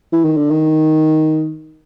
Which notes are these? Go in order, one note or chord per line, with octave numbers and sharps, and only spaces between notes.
E3
D#3
D3
D#3